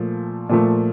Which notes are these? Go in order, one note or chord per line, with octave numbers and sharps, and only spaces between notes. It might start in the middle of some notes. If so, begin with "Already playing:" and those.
Already playing: A#2 F3 A3
A#2 F3 A3